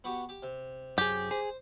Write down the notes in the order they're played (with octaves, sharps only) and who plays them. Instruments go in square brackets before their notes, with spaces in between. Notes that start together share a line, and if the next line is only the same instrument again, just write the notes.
[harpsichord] B3 F#4 G4
G4
C3
[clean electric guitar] F#2 G#4 [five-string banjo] G4
[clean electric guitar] G#4 [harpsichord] C5